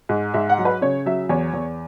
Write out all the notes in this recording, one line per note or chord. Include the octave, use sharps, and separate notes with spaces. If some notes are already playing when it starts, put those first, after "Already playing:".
G#2
G#2 E5
F#5
F#3
B4
C#3 C#5
F#3 E5
E2 C#5
E2